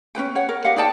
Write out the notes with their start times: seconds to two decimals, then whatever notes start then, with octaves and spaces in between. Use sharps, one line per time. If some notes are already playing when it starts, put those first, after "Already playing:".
0.15 C#4 D4 B4 G5
0.35 C#5 F#5
0.49 A#4
0.64 G4 D#5 F5 F#5
0.76 D#4 D5 G5 A5